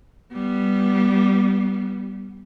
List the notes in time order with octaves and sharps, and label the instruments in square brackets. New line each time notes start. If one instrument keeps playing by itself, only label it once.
[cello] G3 B3